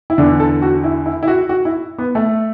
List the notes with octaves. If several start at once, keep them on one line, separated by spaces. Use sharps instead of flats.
E4
E2 D3 D4
A4
F#4
E4
E4
E4
F#4
F#4
E4
B3
A3